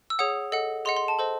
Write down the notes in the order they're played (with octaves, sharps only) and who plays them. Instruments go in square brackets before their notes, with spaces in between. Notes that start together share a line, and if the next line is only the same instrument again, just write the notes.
[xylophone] E6
G#4 C#5 F#5 D#6
A4 D#5 F#5
G#4 D#5 F#5 C6
C6
A5
A4 C5 D#5